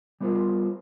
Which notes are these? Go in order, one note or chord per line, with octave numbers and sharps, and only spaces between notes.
G3 B3 F4 A#4 C5